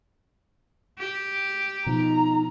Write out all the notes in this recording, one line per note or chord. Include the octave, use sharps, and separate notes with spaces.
G4
B2 F3 D#4 A#5